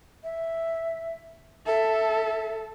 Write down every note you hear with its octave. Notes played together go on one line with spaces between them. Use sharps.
E5
A4 E5